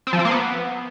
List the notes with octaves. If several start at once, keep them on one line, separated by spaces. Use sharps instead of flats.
C4
F3
C4
A#3
B3